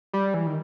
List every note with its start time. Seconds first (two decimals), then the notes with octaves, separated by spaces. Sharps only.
0.13 G3
0.34 E3
0.47 D#3